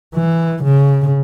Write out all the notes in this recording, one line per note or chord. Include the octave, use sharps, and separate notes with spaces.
E3
C#3